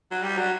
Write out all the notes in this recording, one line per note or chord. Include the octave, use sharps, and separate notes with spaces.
F#3
G3
F#3